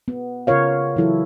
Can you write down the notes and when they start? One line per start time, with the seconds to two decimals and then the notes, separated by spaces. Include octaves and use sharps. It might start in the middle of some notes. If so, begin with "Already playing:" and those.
0.08 B3
0.47 C#3 F4 A#4 C#5 F5
0.96 E3 F#3 E4 A4